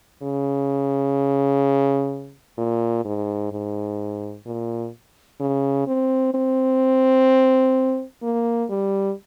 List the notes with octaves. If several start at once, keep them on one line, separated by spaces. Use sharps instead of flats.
C#3
A#2
G#2
G#2
A#2
C#3
C4
C4
A#3
G3